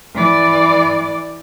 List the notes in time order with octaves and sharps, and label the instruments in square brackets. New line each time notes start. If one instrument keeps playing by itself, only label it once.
[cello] E3 D5